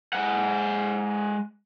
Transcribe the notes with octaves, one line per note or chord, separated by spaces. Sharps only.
G#3 F#5